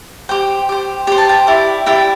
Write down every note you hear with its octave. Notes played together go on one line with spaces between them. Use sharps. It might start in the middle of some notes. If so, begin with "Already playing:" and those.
G4 C5 G5
G4 C5
G4 C5 G5
A5
G5
E4 G4 D5
E4 G4 D5 G5